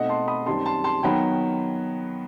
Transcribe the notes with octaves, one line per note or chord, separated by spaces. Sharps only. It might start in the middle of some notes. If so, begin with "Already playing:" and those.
Already playing: B2 A3 C4 D#4 D#5 F#5
A5 C6
B5 D#6
F#2 D#3 G3 C4 A5 C6
A5 C6
A5 C6
D#3 F#3 B3 G5 B5